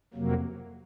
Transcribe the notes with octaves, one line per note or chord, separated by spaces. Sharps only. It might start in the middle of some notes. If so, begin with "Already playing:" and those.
F2 C3 F#3 A#3